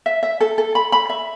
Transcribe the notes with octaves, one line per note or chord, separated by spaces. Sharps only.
E5
E5
A4
A4
B5
B5
E5